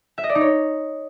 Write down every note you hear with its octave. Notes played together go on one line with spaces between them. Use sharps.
E5
D#5
D5
D#4
C#5